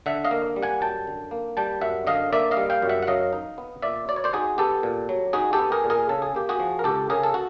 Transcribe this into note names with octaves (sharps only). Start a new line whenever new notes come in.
D3 E5 F#5
D#5 F5
A#3
G3
F#5 G#5
F#2 G5 A5
D3
A#3
G3 G5 A5
F#2 E5 F#5
D3 D#5 F5
A#3 D5 E5
D#5 F5
G3
F5 G5
F#2
E5 F#5
F#5
F#3 D#5 F5
D#4
B3
A#2 D5 E5
F#3 D5
C#5
C5 D5
D#4 F#4 G#4
B3 G4 A4
A#2
F#3
D#4 F#4 G#4
G4 A4
B3
G#4 A#4
A#2
G#4 A#4
C#3 A4
G#4
A#3 G4
F#4 G#4
F3
A#4
C#2 G4 A4
C#3 G#4 A#4
A4
F#4